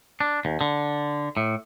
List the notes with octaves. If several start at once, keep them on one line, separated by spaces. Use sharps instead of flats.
D4
D#2
D3
A2